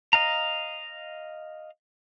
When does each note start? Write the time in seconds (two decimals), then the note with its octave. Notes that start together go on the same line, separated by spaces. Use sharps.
0.13 D#5 F5 A#5